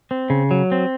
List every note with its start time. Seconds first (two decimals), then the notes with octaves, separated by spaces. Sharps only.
0.11 C4
0.30 C#3
0.51 F#3
0.72 C4